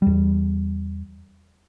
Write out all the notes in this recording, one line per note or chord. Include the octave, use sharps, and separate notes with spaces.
E2 G3